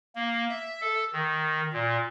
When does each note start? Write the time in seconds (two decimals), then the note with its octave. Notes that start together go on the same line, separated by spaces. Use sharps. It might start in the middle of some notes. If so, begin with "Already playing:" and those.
0.15 A#3
0.49 E5
0.81 A4
1.13 D#3
1.73 A#2